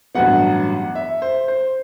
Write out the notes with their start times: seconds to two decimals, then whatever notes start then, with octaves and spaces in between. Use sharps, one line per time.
0.15 A1 G2 F#3 B3 F#5
0.95 E5
1.22 C5
1.48 C5